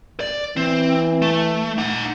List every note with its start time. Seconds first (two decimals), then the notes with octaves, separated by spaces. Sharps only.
0.20 D5
0.57 E3 C4
1.22 A3
1.78 D#4 F#5